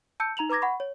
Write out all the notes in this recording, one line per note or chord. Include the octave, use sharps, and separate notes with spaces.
A5 E6 G6 C#7
D#4 A#5 F7 F#7
B4 A#5 D6 G#6 A#6
F#5 B5 C#6
C#5